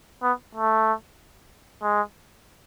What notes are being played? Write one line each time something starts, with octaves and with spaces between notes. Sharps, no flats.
B3
A3
G#3